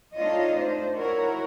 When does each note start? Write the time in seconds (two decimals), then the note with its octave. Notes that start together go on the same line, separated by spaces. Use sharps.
0.15 A3 D4 D#4 F4 C#5 D#5
0.55 D4 C5
0.97 E4 F#4 A#4 C#5